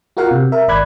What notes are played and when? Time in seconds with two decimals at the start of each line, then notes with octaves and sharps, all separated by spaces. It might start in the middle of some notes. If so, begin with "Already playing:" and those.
0.17 F4 F#4 A#4 F5 F#5
0.31 C3
0.52 A#4 E5
0.68 G#1 D5 B5 F#6 G#6